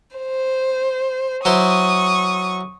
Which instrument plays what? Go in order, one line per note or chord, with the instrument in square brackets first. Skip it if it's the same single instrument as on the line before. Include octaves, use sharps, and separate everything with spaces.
[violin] C5
[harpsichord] F#3 E4 C5 [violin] C#6 D#6